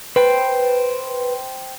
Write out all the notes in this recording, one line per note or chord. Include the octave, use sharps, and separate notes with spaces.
B4 C5 G5